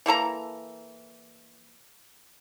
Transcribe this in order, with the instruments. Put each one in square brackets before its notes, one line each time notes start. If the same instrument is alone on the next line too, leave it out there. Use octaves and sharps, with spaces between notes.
[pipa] E3 A#3 A4 A#5